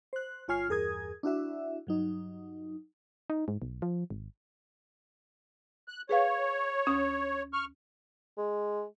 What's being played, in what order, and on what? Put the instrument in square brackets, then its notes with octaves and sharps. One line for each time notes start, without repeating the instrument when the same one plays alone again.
[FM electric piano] C5 F#6
G1 F4 C#5 G#5 F6 C7
E2 G2 G#4 A#4 D#6 G#6
D4 E4 F#4 E5
G2 F#3 D#4
[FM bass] D#4
G#2
B1
F3
G#1
[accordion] F#6
[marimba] G#4 B4 F5 [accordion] C#5
[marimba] D2 C#4 D#6
[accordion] C#6 F6
[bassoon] G#3